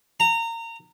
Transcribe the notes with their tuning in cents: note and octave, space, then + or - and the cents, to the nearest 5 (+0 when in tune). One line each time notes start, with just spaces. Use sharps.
A#5 -25